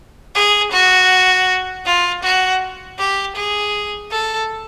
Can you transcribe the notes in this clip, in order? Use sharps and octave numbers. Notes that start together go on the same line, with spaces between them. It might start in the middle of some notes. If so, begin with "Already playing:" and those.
G#4
F#4
F4
F#4
G4
G#4
A4